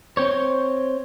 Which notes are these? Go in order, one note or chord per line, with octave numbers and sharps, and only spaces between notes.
C4 C5 C#5